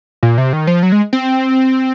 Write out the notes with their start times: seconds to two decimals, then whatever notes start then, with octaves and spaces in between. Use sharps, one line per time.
0.23 A#2
0.38 C3
0.53 D#3
0.67 F3
0.83 F#3
0.92 G#3
1.13 C4